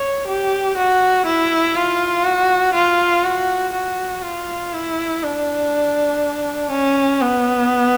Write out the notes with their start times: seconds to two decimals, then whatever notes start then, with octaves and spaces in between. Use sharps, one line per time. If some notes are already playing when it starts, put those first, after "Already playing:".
Already playing: C#5
0.28 G4
0.77 F#4
1.27 E4
1.75 F4
2.25 F#4
2.74 F4
3.24 F#4
3.73 F#4
4.23 F4
4.74 E4
5.23 D4
6.71 C#4
7.21 B3